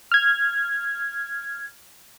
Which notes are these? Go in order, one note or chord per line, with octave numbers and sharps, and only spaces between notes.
F6 G#6